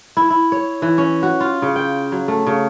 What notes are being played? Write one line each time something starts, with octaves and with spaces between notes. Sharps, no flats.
E4
E4
C#5
E3
C#4
F#4
F4
C#3
G5
F#3
A3
C#3